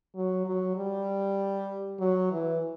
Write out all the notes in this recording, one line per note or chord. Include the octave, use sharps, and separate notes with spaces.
F#3
F#3
G3
F#3
E3